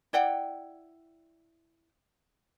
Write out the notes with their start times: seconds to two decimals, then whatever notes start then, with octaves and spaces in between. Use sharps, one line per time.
0.13 E4 D5 F#5 G5